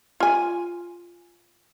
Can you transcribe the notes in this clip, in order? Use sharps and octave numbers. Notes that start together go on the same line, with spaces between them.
F4 G#5